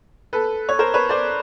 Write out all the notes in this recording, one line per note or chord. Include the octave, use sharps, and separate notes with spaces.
A4 B4
C#5
A#4 C5
B4 C#5
C5 D5